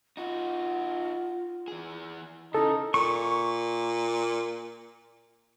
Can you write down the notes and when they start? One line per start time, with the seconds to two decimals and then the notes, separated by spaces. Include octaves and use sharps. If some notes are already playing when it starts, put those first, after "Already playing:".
0.17 D#4 F4 F#4
1.68 E3 G#4
2.55 C#3 D#4 E4 A4
2.94 A#2 C#6